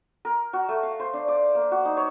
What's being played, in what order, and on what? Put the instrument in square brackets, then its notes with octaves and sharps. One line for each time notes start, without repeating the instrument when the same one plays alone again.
[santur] A#4
F#4
A3
F5
C5
D4
D5
A#3
F#4
D#4
C#5